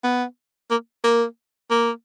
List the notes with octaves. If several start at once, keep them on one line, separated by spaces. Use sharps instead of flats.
B3
A#3
A#3
A#3